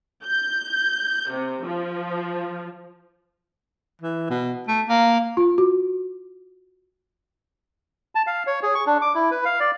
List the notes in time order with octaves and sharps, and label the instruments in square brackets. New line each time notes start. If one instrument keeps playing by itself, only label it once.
[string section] G6
C3
F3
[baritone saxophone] E3
B2
A3
A#3
[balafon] F4
F#4
[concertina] A5
F5
C#5
G#4
C#6
D4
D6
E4
B4
F5
D5